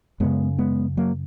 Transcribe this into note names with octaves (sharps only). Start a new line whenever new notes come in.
F#2 C#3 G#3 B3
G#3 B3
F#3 A#3